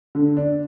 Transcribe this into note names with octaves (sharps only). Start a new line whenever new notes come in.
D3
D4